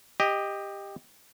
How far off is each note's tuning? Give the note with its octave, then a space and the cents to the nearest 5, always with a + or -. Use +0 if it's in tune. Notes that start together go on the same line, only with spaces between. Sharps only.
G4 +15 D#5 +0